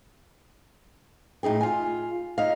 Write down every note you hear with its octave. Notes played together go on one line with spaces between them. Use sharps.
A2 D#4 G#4 G5
F4 G#5
D#4 F5